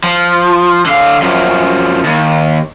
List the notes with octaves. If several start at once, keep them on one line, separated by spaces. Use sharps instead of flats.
F3
D3 F5
F#2 F3
D#2